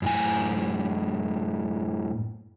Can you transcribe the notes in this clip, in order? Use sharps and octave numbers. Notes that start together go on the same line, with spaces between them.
F#2 A2 G#5